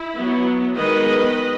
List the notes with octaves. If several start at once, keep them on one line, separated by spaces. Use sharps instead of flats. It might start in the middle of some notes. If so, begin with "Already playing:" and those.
Already playing: E4
F#3 B3
D#3 G#3 B3 B4 D#5